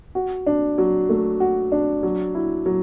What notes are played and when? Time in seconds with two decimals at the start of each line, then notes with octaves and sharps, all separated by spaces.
0.15 F#4
0.46 D4
0.78 F#3
1.09 A3
1.40 F#4
1.72 D4
2.03 F#3
2.35 E4
2.66 F#3